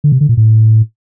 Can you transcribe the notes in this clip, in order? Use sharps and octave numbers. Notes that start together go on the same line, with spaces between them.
D3
C3
D3
A#2
A2